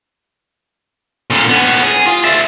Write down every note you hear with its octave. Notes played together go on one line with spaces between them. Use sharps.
A#2 D3
B3 C#4
G#4
F4
D5 E5